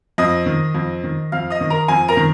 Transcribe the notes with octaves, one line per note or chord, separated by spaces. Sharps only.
F2 D#5 D#6
D#3
F2
D#3
F2 F5 F6
D#5 D#6
D#3
A#4 A#5
F2 G#5
A#4 A#5
D#3